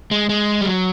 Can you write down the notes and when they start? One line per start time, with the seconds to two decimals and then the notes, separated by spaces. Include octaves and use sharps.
0.11 G#3
0.29 G#3
0.61 G3
0.66 F#3